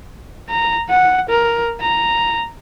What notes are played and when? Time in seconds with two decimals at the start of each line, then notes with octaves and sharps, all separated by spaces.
0.49 A#5
0.90 F#5
1.29 A#4
1.80 A#5